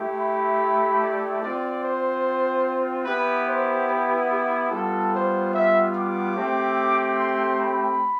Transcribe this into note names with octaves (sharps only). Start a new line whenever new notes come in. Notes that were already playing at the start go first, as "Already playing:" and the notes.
Already playing: A3 E4 G4
B5
D5
C4 F4 D5
C5
B3 E4 G4 B4
C5
B4
G4
G3 B3 F4 A4
C5
E5
D6
A3 C4 G4
C6
B5